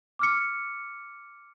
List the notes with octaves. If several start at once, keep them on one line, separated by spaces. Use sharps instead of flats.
D6 F6 C#7